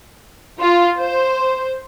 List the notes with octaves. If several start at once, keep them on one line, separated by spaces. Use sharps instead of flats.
F4
C5